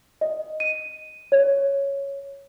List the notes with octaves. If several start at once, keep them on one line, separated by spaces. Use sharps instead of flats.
D#5
D#7
C#5